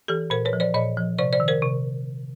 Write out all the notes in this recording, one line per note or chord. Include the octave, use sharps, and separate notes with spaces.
E3 G4 A4
A#2 A#4 C5
B4 C#5
F3
C5 D5
A#2 C#5 D#5
F3
C3 C5 D5
C5 D5
D#3
A#4 C5
C3